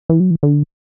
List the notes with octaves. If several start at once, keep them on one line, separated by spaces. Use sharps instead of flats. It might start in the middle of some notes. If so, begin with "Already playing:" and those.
E3
F#3
E3
D3